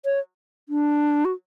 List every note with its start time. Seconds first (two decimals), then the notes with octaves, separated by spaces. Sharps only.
0.05 C#5
0.69 D4
1.25 F#4